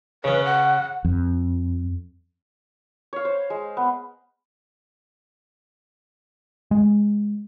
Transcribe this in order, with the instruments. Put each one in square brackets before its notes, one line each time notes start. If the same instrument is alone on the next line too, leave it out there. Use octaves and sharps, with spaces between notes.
[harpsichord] C#3 C#4 [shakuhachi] B4
[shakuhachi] F#5
[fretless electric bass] F2
[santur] C#5 F5
C5
G#3
B3
[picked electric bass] G#3